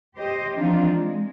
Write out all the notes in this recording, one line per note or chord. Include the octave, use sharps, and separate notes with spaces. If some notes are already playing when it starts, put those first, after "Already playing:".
G4 C5 D#5
E3 F3 C4 D4 D#4 F4
G#3